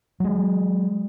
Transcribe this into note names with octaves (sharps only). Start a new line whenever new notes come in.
F#3 G#3